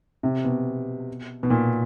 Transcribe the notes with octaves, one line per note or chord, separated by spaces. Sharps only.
C3
B2
B2
A#2